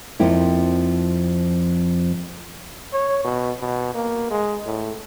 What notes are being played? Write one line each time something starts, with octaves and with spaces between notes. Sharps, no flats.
F2 F3 A#3 C4 E4
C#5
B2
B2
A#3
G#3
A2